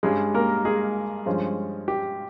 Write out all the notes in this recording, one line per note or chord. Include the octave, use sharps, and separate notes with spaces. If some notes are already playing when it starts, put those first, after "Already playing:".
G2 G3 G#3 C#4 G#4
A#3 A#4
G#3 G#4
G2 F3 G#3 C#4
G4